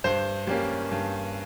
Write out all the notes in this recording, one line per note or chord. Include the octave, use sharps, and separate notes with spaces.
G2 C5
G3 A#3 C#4
G2